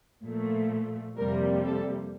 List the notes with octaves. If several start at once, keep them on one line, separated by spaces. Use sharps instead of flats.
A#2 F3 A3
F2 C3 G3 A#3 A#4
A4